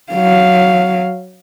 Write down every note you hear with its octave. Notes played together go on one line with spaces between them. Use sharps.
F#3 F5